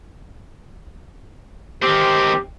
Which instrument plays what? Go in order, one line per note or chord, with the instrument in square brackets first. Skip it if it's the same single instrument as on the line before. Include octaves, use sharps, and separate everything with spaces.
[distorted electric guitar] D#3 C4 [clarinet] G4